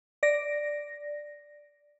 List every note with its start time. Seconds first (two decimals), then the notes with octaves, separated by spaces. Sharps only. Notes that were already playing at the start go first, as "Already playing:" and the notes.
0.23 D5 A#6